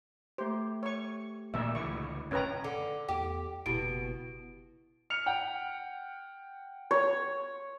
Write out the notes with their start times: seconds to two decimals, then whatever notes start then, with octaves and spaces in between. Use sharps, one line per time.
0.38 A3 G4 C5
0.83 C#5 C#6
1.54 D2 A#2 E5
1.75 C#2 D3 E3 C#6
2.31 F1 F#2 C#4 B4 G5 A#5 F#6 G#6
2.64 D3
3.09 E2 G4
3.66 F#1 B2 E4 G4 D7
5.10 F6 C#7 F7
5.26 F#5 G5
6.91 C#5